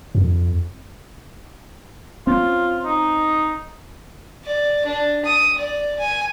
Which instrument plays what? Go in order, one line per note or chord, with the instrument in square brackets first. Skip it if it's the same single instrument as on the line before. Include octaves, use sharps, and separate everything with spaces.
[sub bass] F2
[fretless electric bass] C4 C#4 [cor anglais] F4
[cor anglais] D#4
[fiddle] D5
D4
D#6
D5
G#5